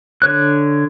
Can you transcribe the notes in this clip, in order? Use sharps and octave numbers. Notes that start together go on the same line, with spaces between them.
D3 C#5 F#6